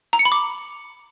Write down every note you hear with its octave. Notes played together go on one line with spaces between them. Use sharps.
A#5
C#7
B5
D6